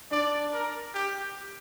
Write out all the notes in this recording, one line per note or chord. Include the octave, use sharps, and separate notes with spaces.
D4 D5
A#4
G4